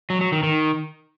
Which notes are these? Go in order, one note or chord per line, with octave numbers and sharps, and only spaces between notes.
F#3
F#3
D#3
D#3